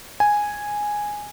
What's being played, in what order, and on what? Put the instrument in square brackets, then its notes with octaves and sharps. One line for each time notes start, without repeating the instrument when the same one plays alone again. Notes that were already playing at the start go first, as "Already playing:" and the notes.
[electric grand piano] G#5